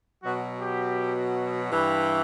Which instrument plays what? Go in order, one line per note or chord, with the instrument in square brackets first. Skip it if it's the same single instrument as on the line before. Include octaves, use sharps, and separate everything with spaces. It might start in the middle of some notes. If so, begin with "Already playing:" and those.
[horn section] B2 F#3 F#4
G4
G2 E3